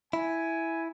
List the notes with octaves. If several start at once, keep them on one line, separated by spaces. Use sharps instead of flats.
E4 G#5